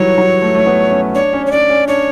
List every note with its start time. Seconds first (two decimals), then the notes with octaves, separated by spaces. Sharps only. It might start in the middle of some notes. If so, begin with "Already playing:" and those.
Already playing: E3 F#3 G3 C#5
0.18 F#3
0.42 A3
0.55 A3
0.66 B3
0.90 C#4
1.15 D4 C#5
1.33 C#4
1.46 C#5
1.51 C#4 D5
1.70 C#4
1.87 D4 C#5